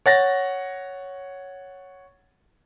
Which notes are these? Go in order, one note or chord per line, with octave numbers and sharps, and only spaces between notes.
C#5 F#5 A6 A#6